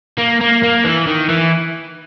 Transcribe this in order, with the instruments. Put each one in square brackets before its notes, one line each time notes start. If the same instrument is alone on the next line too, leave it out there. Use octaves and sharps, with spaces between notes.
[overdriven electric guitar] A#3
A#3
A#3
E3
D#3
E3